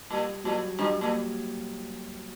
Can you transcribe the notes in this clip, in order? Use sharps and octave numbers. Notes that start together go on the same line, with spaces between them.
A#2 G3
A#2 F#3
G2 G3
A#2 A#3